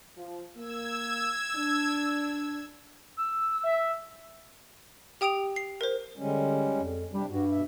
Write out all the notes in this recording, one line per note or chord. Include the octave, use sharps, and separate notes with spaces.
F3
A#3 E6 G#6
D4
E6
E5
G4 G5 D#6 D7 F7
C7
A#4 C5
D3 G3 G#3 C#4
F2
C3 G3 D4 G4
G2 F#4
B2 E5